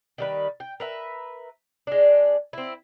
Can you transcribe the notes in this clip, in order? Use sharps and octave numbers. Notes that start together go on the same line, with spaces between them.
D#3 G3 B4
G5
A#4 B4 E5
G#3 D4
C4 E4